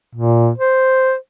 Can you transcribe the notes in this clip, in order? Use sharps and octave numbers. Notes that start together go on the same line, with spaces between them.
A#2
C5